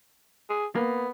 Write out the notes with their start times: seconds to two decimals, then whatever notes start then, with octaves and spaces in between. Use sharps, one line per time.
0.50 G#4
0.75 A#3 B3